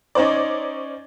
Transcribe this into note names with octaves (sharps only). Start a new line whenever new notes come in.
C#4 D#4 C5 D5